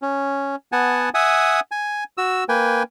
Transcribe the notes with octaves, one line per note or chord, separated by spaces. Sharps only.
C#4
B3 F#5 G#5 A5
E5 F#5 G#5 D#6
G#5
F#4 E6
A#3 B4 G5 G#5